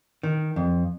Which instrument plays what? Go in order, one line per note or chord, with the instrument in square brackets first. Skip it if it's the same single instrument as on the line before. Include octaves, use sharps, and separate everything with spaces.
[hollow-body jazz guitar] D#3
F2